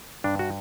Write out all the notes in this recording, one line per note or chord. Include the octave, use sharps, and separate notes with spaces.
G2 D4
F#4